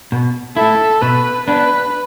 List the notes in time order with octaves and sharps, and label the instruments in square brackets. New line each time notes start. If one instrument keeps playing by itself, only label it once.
[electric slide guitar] B2
[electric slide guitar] A3 E4 [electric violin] A4
[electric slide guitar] B2 [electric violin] B4
[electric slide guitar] B3 D4 [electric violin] B4